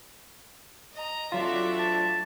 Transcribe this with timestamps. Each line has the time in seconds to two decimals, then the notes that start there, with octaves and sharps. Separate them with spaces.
0.93 D#5 A#5
1.32 F#3 A3 C4 D4 F4 F#4 E5
1.79 A5